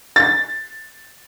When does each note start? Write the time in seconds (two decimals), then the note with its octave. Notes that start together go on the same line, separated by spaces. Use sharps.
0.16 A6